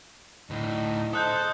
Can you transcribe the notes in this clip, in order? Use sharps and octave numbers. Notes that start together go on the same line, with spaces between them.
D2 A2 D#4
A4 C5 D#5 D#6 F#6 G6